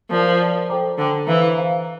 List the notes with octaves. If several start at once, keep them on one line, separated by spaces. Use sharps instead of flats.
F3 A#4 D5 A5
A#4 D5 A5
A4 C5 G5 A#5 D6
D3 A4 C5 G5 A#5 D6
E3 C5 F5 A#5
C5 F5 A#5